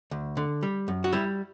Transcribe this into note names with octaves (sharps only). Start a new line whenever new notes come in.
D2
D3
G3
F#2
F#4
G3 E4